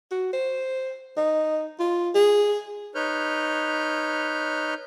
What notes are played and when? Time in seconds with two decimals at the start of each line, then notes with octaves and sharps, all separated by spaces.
0.11 F#4
0.33 C5
1.17 D#4
1.79 F4
2.15 G#4
2.95 D#4 B4 C#5 F6 G6